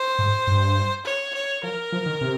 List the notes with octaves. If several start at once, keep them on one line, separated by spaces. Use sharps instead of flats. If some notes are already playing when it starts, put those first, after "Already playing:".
Already playing: C5
G#2
G2
C#5
C#5
F3 A#4
F3
D#3
C3